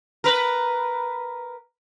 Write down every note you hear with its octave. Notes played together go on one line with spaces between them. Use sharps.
A#4 B4